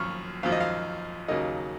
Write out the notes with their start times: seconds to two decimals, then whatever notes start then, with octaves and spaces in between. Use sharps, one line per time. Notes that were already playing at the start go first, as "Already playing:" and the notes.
Already playing: G#1 F#2 F3 C#6 F6
0.43 G#1 F#2 F3 F5
0.52 D#5
0.61 F5
1.28 D#2 C#3 F#3 A#3 D#4 D#5